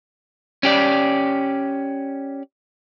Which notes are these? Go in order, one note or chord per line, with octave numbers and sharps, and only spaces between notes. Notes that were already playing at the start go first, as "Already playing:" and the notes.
C#4 G4 D5